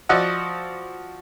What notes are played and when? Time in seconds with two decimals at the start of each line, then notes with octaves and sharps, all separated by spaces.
0.09 F3 F#4 D5 D#5 F#5 E6